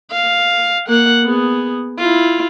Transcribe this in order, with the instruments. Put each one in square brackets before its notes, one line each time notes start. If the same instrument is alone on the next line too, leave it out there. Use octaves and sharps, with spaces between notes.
[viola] F5
A#3 F#5
B3 G#4
E4 F4